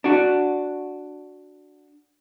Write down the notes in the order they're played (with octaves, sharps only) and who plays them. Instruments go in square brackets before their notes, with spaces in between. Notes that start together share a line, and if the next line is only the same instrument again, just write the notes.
[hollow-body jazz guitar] D4 F#4